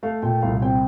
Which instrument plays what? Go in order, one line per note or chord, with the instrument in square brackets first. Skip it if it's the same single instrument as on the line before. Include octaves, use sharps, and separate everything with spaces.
[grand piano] A3 F5
A#2 G5
C2 F5
C4 G5